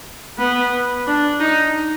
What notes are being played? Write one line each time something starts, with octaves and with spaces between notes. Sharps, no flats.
B3
D4
D#4